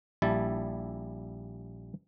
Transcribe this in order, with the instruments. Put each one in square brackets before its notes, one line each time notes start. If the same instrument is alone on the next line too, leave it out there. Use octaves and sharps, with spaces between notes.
[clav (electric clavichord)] A#1 G3 E4 A5